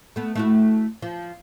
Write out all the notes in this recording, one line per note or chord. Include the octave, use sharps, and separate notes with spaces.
A3 B3
A3 E4 F#4
F3